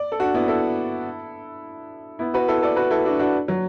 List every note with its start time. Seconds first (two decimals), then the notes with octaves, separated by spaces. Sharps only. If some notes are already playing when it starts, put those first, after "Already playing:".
Already playing: D5
0.12 A4
0.20 D4 F#4
0.34 B3 E4
0.48 E4 A4
2.19 B3 E4
2.34 F#4 B4
2.48 E4 A4
2.62 A4 D5
2.76 F#4 B4
2.91 E4 A4
3.05 D4 F#4
3.19 D4 F#4
3.48 F#3